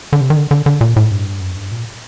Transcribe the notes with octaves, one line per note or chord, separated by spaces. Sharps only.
D3
C3
D#3
D3
D3
D3
A#2
A2
G2
F#2
G2
A#2